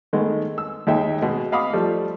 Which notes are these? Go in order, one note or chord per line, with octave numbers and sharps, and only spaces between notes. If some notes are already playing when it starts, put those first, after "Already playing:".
D#3 G#3 A3 B3
E6
D#2 G#3 D#4 E5 G5
B2 G#3
D#5 F5 F#5 B5 D6 D#6
F3 G3 A3